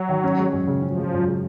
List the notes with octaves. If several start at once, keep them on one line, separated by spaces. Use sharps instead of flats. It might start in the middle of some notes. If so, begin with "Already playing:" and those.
Already playing: F#3
D#3
C#4
G#3
F#2
C#3
F3 C#4
G#3
F#2
C#3